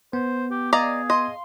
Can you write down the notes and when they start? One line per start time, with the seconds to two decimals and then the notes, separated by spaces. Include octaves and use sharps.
0.13 B3 C5
0.51 G4
0.73 G#4 D5 D#5 F5 A#5
1.10 D#5 C6